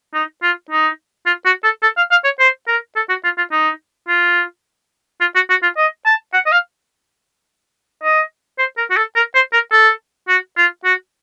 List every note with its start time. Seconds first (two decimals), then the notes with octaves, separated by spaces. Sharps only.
0.14 D#4
0.42 F4
0.70 D#4
1.26 F4
1.45 F#4
1.64 A4
1.83 A4
1.97 F5
2.11 F5
2.24 C#5
2.39 C5
2.68 A#4
2.96 A4
3.09 F#4
3.24 F4
3.38 F4
3.52 D#4
4.08 F4
5.20 F4
5.35 F#4
5.50 F#4
5.62 F4
5.77 D#5
6.06 A5
6.33 F#5
6.46 D#5
6.52 F5
8.03 D#5
8.58 C5
8.77 A#4
8.90 F#4
8.97 A4
9.16 A#4
9.34 C5
9.53 A#4
9.72 A4
10.28 F#4
10.57 F4
10.84 F#4